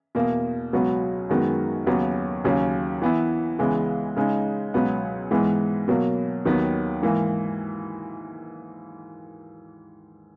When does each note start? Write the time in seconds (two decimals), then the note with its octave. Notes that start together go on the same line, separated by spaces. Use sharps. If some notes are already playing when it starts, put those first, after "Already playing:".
0.15 E2 B2 A#3
0.73 C#2 B2 F#3 B3 F#4
1.29 F#2 D#3 G#3 B3 F#4
1.86 D#2 C#3 F#3 B3 F#4
2.44 D#2 C#3 F#3 C#4
3.02 E3 B3 E4
3.59 C#2 C#3 E3 G#3 B3
4.17 C#3 G#3 D#4
4.74 C#2 B2 F#3 B3
5.31 G#2 E3 G#3 B3
5.88 B2 F#3 A#3
6.45 D#2 D#3 F#3 B3
7.02 G#2 E3 A#3